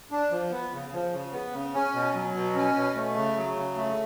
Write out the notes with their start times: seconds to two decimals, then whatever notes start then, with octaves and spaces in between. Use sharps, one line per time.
0.11 D4
0.31 F3
0.51 B3
0.72 C#3
0.93 F3
1.13 C#3
1.32 B3
1.53 C#3
1.74 C#4
1.94 B2
2.14 F#3
2.34 B2
2.55 C#4
2.75 B2
2.95 A3
3.16 C#3
3.36 F#3
3.56 C#3
3.76 A3